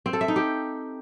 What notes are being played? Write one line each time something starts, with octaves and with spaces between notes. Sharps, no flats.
C4
A4
E5
D#4
G4